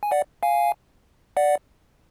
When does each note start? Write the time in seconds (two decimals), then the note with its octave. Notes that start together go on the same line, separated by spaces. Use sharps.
0.03 G#5
0.11 D5 F#5
0.43 F5 G#5
1.37 D5 F#5